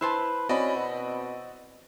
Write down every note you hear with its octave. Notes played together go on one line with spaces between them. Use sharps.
E4 B4 C5 A5
C4 C#4 F#4 D5 D#5 B5
B2